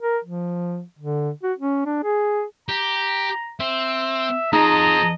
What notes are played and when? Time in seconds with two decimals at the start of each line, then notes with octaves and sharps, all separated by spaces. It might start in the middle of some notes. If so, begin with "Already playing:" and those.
0.01 A#4
0.25 F3
0.99 D3
1.43 F#4
1.58 C#4
1.86 D4
2.04 G#4
2.68 G4 A#5
3.60 C4 E5
4.53 F3 C4 D#4 G#4 D#5 A5 A#5